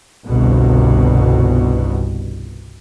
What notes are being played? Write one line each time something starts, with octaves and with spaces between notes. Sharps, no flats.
G1 C2 B2